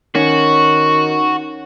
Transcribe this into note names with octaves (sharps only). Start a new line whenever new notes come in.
D#3 C#4 F#4